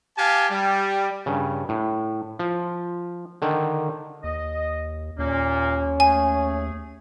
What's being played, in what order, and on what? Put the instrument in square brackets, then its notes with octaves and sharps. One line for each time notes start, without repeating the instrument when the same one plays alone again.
[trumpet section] G4 F5 G#5 A5
G3
[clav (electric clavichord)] G2 C#3
A2
F3
D3 D#3
[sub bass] D#2 [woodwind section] D#5
[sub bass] D#2 [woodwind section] A#2 A#3 [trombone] C#4
[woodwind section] A3 G#4 [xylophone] G#5